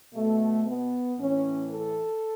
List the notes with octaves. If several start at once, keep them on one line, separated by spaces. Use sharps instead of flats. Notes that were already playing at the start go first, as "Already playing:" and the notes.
B2 A3
B3
A2 E3 C#4
A4